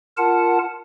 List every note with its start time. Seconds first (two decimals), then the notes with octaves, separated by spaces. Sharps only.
0.18 F4 A#4 F#5 A5